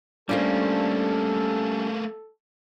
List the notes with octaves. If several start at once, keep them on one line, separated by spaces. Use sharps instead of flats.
G3 A3 A#3 C#4 D4 F4 A4 C5